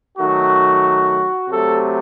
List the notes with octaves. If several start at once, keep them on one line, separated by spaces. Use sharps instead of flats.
D#3 F#3 A3 F#4
C3 F#3 A3 A4